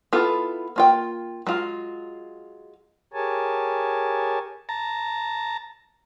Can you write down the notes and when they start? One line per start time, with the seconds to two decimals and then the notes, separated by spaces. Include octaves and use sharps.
0.13 B3 E4 F4 A4
0.76 A#3 F4 G5
1.47 F#3 G#3 F4
3.13 G4 G#4 A#4 C#5 G#5 A5
4.69 A5 A#5